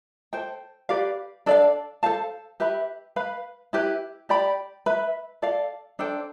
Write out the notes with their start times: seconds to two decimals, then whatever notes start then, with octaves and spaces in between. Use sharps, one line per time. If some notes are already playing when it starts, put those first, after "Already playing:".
0.33 A4 C5 G5
0.89 G4 B4 D5 F5
1.46 D4 A4 D5 F5
2.03 A4 C5 F5 A5
2.60 G4 B4 E5 B5
3.16 B4 F5 B5
3.73 E4 G4 B4
4.29 G4 D5 G5 B5
4.86 B4 E5 B5
5.42 A4 D5 F5
5.99 D4 A4 C5 G5